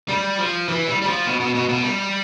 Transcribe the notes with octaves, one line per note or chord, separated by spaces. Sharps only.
G3
F3
E3
G3
G3
F3
B2
B2
B2
B2
G3